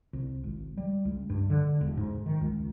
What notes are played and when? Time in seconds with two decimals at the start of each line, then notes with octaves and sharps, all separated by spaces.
0.13 C2
0.44 G#1
0.77 G3
1.05 C#2
1.30 G2
1.50 D3
1.81 E1
1.97 G#2
2.26 D#3
2.41 C#2